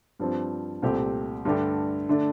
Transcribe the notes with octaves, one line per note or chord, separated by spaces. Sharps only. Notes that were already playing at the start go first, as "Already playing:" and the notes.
G2 F3 C4
C2 A#2 A3 C4 G4
G2 D3 A3 D4 G4
D3 A3 D4